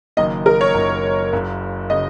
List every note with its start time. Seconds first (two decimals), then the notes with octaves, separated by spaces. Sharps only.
0.17 F#1 F#2 D#3 A#3 D#5
0.46 A#4
0.61 C#5
0.74 F#1 F#2 D#3 A#3
1.32 F#1 F#2 C#3 F#3
1.90 C#3 F#3 D#5